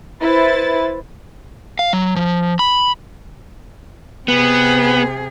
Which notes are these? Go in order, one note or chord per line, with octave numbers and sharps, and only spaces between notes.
E4 B4 C5 A6
F5
F#3
F3
B5
C3 B3 G#4